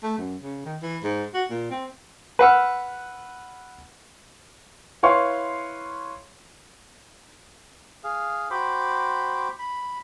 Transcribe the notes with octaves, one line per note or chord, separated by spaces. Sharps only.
A3
F#2
C#3
D#3
E3
G#2
F#4
A#2
C4
B4 F#5 E6 F6
E4 B4 C#5 F5 C6 C#6
G#4 F5
F#4 C5 G5 B5 D6
B5